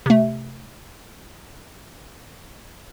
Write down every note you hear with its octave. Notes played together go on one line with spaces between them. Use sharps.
C3 A3